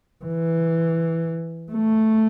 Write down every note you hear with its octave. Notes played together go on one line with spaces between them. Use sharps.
E3
A3